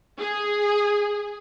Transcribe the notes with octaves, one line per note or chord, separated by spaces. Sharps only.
G#4